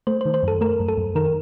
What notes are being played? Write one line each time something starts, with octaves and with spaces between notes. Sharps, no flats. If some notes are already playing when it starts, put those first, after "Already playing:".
A3 C5
C5
D#3
C5
F#2 A4
A3 A#4
F#2
A4
F#2
D#3 A#4